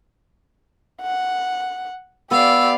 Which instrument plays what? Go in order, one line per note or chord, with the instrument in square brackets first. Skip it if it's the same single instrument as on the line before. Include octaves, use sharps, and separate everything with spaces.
[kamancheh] F#5
[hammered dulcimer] B3 [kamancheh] G4 D5 [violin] F5 [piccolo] E6